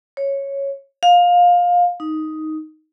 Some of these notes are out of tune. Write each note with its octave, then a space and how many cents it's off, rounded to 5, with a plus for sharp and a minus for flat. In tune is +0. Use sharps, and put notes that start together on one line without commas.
C#5 -5
F5 +20
D#4 +5